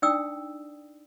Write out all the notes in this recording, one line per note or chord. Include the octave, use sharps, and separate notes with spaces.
D4 D#4 D5 G5 D#6 E6